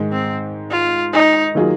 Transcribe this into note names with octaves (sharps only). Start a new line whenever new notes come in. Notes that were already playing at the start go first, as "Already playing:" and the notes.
Already playing: G#2 D#3 G#3
C4
F4
D#4
D#3 F#3 A#3 F4 G#4